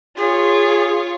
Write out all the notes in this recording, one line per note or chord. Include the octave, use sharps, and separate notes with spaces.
F4 G#4 C#5